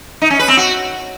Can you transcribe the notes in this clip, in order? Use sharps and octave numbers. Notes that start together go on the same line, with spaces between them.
D#4
C#4
B4
C4
F#4